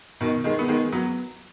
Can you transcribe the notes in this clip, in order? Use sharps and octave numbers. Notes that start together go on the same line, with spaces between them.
B2 D#3
D#3 G#3
B3
D#3 G#3
F#3 B3